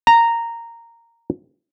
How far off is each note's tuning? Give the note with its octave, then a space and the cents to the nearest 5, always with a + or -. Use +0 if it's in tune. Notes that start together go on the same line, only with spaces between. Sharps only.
A#5 -10